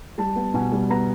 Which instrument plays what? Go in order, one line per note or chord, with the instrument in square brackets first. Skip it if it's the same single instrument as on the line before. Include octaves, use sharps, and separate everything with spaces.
[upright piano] G3 A5
B3
B2 G#5
G3
B3 A#5